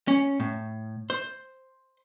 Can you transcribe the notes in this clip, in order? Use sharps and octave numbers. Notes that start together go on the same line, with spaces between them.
C#4
A2
C5